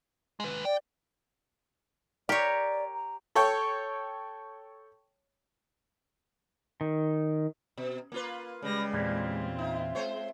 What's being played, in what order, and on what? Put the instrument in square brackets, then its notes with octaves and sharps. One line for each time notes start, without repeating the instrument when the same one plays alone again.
[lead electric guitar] G#3 B4
[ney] D5 [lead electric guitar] G5
[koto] G4 C#5 [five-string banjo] A#4 [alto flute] D5
[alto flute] A#5
[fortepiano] A4 C#5 G5
[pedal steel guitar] D#3
[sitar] B2
A#3 F4 B4
[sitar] C#3 G3 [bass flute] G#3 [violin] B4 A#6
[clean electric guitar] E2 A#2 E3 [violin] C4 F4
[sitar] D#4 [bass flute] E5
[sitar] G#3 C5 C#5